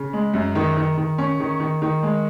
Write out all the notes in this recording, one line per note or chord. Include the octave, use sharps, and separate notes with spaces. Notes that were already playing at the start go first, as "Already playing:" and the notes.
Already playing: C#3
G#3
F#2
D#3
D#3
D#3
C#4
D#3
D#3
D#3
G#3